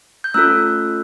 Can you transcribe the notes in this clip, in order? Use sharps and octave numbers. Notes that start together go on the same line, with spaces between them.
G6
A3 C#4 F4 A4 E6 F#6